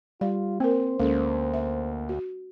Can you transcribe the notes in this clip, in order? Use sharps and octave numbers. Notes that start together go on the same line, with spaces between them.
G3 F4 F5
A#3 C4 A#4 C5
D2 G#3 A#3 C#4 A4
E5
F#4